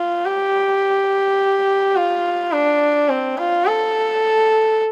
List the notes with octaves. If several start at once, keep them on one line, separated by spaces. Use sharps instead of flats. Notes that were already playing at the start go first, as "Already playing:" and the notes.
Already playing: F4
G4
F4
D4
C4
F4
A4